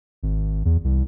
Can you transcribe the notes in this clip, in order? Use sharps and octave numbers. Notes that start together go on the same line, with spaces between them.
G#1
E2
C2